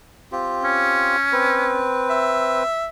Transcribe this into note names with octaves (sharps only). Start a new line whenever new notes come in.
C4 F4 G4
C#4
C4 B4
E5